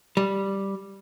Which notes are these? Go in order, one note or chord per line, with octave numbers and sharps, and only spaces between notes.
G3